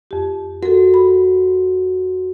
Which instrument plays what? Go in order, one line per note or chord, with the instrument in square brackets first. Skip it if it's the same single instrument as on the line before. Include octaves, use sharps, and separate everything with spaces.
[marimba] F2 G4
[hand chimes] F#4 [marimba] A4 A#4
[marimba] B5